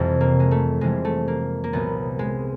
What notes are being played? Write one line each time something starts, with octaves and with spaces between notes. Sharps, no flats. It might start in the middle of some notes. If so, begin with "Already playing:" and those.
Already playing: F2 C3 E3 G3
A#3
G#3
A3
F2 C3 E3 G3 G#3
A3
A#3
A#3
C2 A#2 F#3 B3
G#3